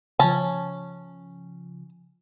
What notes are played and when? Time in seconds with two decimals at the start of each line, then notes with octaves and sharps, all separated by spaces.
0.19 C#3 F3 C#4 A5